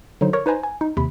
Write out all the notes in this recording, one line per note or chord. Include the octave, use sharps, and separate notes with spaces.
D3 F#3 D#4 C5
A#4 C#5 C#6 A#6
D#4 B4 C5 G#5 A#5
G#5
D#4
D#2 C3 B5